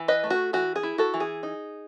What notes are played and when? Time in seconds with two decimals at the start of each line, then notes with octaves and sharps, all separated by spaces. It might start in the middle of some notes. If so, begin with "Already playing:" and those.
Already playing: E3
0.08 B4 D#5
0.23 A3
0.30 F#4
0.53 E3 F#4
0.76 G#4
0.83 E4
0.98 F#4 A4
1.14 E3
1.20 G#4
1.43 D#4